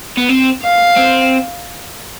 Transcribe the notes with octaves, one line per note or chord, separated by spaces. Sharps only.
B3
C4
F5
C4